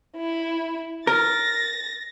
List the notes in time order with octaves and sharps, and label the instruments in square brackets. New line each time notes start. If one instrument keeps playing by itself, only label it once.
[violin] E4
[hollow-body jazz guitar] A#4 [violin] A6 A#6